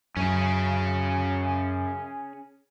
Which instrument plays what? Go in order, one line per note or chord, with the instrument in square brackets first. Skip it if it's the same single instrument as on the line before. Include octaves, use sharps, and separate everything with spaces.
[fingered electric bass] F#2 [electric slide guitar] C#4 G#4